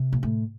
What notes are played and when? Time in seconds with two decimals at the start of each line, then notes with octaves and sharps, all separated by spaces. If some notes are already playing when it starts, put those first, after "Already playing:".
Already playing: C3
0.13 A#2
0.23 A2